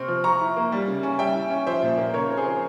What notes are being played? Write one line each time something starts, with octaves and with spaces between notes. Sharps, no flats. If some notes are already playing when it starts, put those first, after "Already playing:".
Already playing: C3 C4 C#6 F6
F3
F3 A#5 C#6
E4
A#3
G3
C#3
C#4
G3 E5 G5
E4
C#4
F3 C5 E5
A#2
A#3
C#3 A#4 C#5
C4
G#4 C5
F3